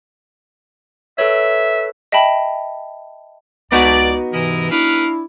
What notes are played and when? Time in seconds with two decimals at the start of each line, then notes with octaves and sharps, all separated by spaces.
1.18 A4 B4 C#5 E5
2.12 D#5 E5 G5 A5 B5
3.72 C#2 B3 D#4 F#4 D5
4.33 G#2 C3 E3 E4 A#4 D#5
4.71 D4 E4 A#4 B4 F5